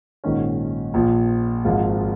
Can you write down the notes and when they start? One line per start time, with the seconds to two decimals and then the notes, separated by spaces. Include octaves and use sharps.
0.24 A#1 G#2 D#3 C#4
0.94 A#1 A#2 F3
1.65 G#1 G#2 F3 G#3 F4